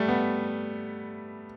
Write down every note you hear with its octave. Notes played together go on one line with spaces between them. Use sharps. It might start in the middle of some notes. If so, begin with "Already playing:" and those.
Already playing: G3 A3
B3